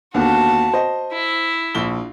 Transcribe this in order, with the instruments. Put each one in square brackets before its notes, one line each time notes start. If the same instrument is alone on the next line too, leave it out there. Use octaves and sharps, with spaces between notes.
[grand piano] D#2 D3 B3 [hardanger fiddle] F#4 A5
[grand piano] C5 D#5
[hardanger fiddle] E4
[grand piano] A#1 G7